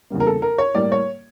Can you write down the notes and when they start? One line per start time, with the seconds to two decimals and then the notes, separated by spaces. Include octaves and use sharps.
0.10 E2 C#3 G3 A#3
0.20 A#4
0.27 A4
0.42 A#4
0.58 C#5
0.75 A2 G3 A#3 D5
0.92 C#5